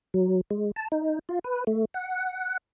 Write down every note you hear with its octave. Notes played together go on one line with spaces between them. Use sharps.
F#3
G#3
A5
D#4
F4
B4
A3
F#5